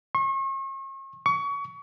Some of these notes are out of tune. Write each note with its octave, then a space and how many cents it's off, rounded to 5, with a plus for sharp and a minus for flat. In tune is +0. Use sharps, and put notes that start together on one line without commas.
C#6 -40
C#6 +30